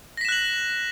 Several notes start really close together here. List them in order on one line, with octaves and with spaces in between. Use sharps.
A#6 B6 E7 F#6 F#7